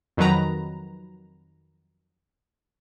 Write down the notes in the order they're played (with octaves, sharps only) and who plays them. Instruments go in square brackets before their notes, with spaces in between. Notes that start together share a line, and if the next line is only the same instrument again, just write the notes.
[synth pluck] F2 D#3 F#3 B4 A#5